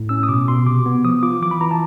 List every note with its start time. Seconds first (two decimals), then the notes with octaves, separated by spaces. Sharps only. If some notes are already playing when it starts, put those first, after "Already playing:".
Already playing: A2
0.09 C#4 E6
0.23 D#6
0.29 B2 D6
0.48 B2 C6
0.66 C3 D6
0.86 B3
1.04 F3 D#6
1.23 F4 D6
1.42 E3 D6
1.51 B5
1.61 E3 A#5
1.71 A5